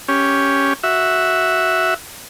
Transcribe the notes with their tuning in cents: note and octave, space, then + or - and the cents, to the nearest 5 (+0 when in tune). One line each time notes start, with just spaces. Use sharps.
C#4 +0 G4 +0
F#4 +0 E5 +0